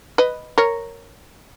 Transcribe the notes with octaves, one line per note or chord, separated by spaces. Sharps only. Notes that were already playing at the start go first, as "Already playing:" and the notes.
B4 D#5
A#4 C#5